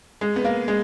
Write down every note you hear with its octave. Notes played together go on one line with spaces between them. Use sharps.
G#3
B3
A#3
G#3